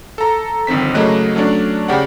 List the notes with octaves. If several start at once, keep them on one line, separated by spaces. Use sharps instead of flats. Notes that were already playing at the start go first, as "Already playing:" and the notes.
A4 A#5
G1 F2 D#3 C4 B6
C#3 F#3 A3 A#3 D#5 F#6
F#3 A3 C#4 D4 D5
C#3 G4 D5 F#5